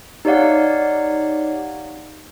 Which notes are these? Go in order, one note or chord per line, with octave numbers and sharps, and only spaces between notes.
D#4 G4 C#5 D5 F5 F#5